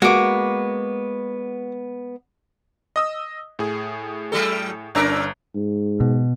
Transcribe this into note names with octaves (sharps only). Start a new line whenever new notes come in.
G#3 A#3 B3 F#4 D6
D#5 D#6 E6
A2 G#4
F#3 G3 A4
G1 C#4 D4 A#4 A#5 E6
G#2
B2